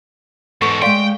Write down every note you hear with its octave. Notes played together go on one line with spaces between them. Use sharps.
E2 G#2 A4 C#6
G#3 D5 F5 G5 C6